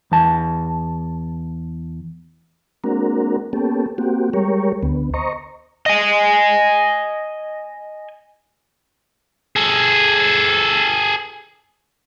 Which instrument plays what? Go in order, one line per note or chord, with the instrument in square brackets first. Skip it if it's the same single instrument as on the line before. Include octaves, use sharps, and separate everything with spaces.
[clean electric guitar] E2 A5
[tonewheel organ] G#3 A#3 C4 D4 F#4 A#4
A#3 B3 C#4 G4 A4
A#3 C4 F#4 G4
G3 G#3 G4 A#4 C#5
D2 D3 B3
C5 D#5 A#5 C#6
[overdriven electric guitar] D#5 G#5
[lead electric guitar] G#4 A4